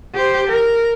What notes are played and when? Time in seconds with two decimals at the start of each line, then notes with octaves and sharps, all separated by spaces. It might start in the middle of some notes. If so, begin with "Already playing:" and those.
0.15 G4 C5
0.48 A#4